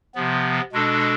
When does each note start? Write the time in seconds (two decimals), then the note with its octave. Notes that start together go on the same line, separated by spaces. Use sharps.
0.15 C3 F3 B3
0.72 B2 G#3 D4 A4